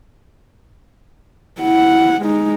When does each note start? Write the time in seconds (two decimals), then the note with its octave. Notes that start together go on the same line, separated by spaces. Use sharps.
1.61 E4 F#5
2.22 G#3 D#4